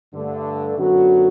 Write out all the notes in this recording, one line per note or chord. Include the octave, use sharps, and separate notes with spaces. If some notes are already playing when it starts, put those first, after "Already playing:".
G2 D3 A3
F#2 D3 F#3 B3 F#4